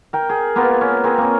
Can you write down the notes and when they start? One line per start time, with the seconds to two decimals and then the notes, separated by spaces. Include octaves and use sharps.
0.13 A#4 G5
0.29 G#4
0.55 A#3 B3 F4 A#4
0.81 C#4
1.04 C4 G#4 A#4
1.18 A#3 C#4